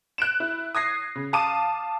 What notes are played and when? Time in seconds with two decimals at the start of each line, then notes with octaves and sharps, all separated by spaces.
0.18 F#6 D7 E7
0.40 E4
0.75 D#6 G#6 A#6 C7
1.16 C#3
1.33 F5 A5 D6 D#6 D#7